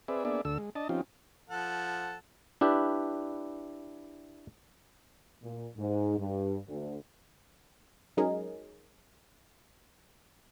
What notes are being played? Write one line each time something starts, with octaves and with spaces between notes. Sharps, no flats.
C4 G#4 B4 D5 E5
A#3 B3 D4 G#4 D5 E5
D2 D3 A4 E6
G#3
D4 D#5 A5
F3 C4 C#4 D#4 F4 G4
F3 A4 F#5
D4 E4 G4 B4
A#2
G#2
G2
D2
F#3 G#3 C#4 D#4 G#4 A#4